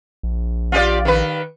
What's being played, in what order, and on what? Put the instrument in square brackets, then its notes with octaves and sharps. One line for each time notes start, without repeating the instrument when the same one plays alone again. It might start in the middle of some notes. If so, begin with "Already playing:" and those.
[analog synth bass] A#1
[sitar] F4 G4 D5
D#3 B4